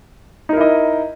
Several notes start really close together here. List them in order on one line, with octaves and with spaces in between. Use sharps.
D#4 A#4 E4 D#5